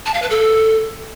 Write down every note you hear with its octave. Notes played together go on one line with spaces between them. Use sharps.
A5
F5
B4
A4